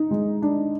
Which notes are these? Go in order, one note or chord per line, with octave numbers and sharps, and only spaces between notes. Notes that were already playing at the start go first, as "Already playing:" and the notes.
Already playing: D#4
G#3
D4